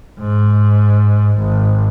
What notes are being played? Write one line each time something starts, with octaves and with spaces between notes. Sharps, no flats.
G#2
G#1